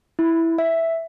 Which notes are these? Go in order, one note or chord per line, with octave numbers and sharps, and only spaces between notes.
E4
E5